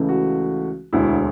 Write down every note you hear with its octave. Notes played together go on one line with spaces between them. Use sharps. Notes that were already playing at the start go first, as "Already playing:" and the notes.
Already playing: C#2 C#3 E3 A3
F#4
E1 D2 D3 E4